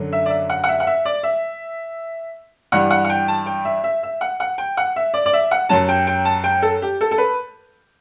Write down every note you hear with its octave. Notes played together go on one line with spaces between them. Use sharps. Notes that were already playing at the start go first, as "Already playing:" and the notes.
Already playing: F#2 D3 F#3
E5
D5
E5
F#5
F#5
E5
F#5
E5
D5
E5
G2 E3 G3 F#5
F#5
F#5
G5
A5
G5
E5
E5
E5
F#5
F#5
G5
F#5
E5
D5
D5
E5
F#5
F#2 F#3 A5
G5
G5
A5
G5
A4
G4
A4
A4
B4